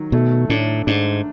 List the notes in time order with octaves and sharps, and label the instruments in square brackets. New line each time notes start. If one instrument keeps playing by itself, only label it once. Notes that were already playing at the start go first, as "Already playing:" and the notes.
Already playing: [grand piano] D#3 F#3
[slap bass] B2 [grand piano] A3
[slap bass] A2 [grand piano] D4
[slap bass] G#2 [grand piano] D4